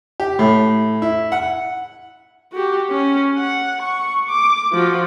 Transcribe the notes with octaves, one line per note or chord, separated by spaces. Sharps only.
G4
A2
E4
F#5
F#4 G4
C#4
F#5
C#6
D6
F3 F#4